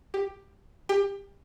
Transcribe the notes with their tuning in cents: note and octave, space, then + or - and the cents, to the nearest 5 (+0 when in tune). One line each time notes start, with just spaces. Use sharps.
G4 +10
G4 +25